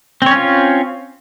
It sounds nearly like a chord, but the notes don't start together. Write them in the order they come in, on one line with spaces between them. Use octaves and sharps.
C4 C#5 C#4 F4